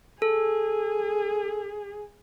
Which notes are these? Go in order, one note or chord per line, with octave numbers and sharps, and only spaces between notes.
G#4 A4